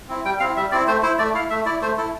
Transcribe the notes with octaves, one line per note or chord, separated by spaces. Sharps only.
C4 E4
G3 G5
C4 E4 F5
G3 E5
C4 E4 D5
A3 C5
E4 C5
A3 D5
E4 F5
A3 E5
E4 D5
A3 C5
E4 A4